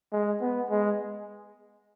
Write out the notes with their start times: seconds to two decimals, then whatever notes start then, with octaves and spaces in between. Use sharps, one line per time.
0.13 G#3
0.41 B3
0.70 G#3